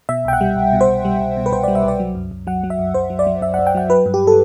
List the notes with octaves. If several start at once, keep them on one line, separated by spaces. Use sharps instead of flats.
B2 E5
C2 G5
F#5
G3
C2
B2
C5
C2
G3
C2
B2
B4
C2 C5
G3 D5
E5
C2 D5
F#3
F#2
F#2
F#3 F#5
F#3
E5
F#2
F#2 C5
F#3
D5
F#3
F#2 E5
F#2 F#5
G5
F#3 F#5
F#3 B4
G2
G4
A4